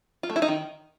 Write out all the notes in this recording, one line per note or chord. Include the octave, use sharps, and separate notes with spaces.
F4
A3
E4
D#4
D#3